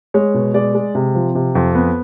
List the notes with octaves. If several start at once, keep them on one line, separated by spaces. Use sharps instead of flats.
G#3 C#5
B2
G#3 D5
G#3
C3
F3
C3
F2
B3